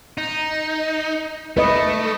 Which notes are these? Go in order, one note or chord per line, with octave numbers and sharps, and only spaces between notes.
D#4
A3 B4 D#5